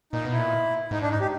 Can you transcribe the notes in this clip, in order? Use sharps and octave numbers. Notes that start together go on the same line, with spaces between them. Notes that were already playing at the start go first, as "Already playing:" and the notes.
A#2 D#4
B2
E4
A#2
G#2 D#4
D4
D#4
G4